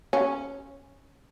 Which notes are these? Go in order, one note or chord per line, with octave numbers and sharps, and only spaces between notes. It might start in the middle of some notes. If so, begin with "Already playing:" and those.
C#4